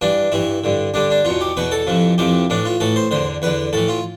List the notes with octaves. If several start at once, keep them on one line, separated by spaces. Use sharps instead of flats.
G2 E3 D4
G2 E3 E4
G2 D3
G2 D3 D4
D4
E2 B2 F4
G4
E2 B2 B4
A4
F2 C3 E3
F2 C3 E3 G4
A2 E3 D4
F4
A2 E3 A4
C5
E2 D3 C5
E2 D3 B4
A2 E3 A4
F4